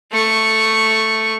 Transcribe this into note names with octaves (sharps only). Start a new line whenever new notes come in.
A3 C#6